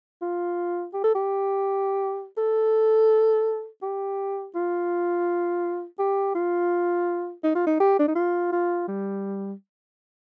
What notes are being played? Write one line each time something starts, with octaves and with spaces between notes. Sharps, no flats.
F4
G4
A4
G4
A4
G4
F4
G4
F4
D#4
F4
D#4
G4
D4
D#4
F4
F4
G3